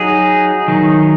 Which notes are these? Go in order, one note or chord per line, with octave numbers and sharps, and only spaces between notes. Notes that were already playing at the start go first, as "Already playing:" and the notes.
Already playing: F#3 D#4 G#4
D#3 F#3 D#4